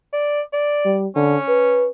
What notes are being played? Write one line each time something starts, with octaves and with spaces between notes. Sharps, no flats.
D5
D5
G3
D3 C#4
B4